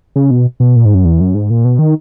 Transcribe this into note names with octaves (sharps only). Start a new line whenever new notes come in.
C#3
B2
B2
A#2
G#2
F#2
E2
F#2
G#2
A#2
B2
D#3